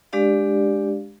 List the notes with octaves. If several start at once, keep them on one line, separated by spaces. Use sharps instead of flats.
G#3 D4 G4 D5 F5